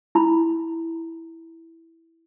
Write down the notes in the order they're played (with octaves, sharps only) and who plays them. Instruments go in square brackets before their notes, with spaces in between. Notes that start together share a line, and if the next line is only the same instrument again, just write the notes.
[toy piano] E4 B5